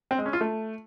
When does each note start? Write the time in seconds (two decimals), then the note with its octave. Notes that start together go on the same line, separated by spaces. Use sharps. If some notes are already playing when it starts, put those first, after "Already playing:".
0.11 C4
0.18 G#3
0.26 C#4
0.33 F4
0.41 A3